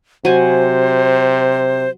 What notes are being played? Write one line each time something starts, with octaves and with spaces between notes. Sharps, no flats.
C3 F#3 C5 G#5